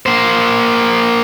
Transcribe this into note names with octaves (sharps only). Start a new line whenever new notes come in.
A#3 C5